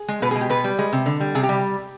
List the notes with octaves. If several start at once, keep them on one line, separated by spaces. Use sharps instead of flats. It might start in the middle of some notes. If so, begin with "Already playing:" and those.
Already playing: G#4
G#3
B2 B4
G#3 G#4
G4
B2 B4
G3
G#3
C3
D3
G3
C3 G#4
G4
G3